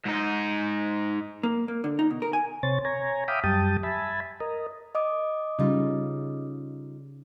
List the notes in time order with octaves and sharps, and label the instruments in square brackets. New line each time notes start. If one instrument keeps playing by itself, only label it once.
[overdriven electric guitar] G#2 D#4
[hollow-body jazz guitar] A#3
A#3
D3
D#4
B2
A#4
G#5
[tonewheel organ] C3 C5 C#5 A6
C#5 G#5 A#5
E5 F5 G5 B5 D6 D#6
F#2 G3 G5 A5 D#6
E5 G#5 A5 B5
A#4 D#5
[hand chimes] D#5 D6 D#6
[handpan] C#3 [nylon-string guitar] G3 D#4 F4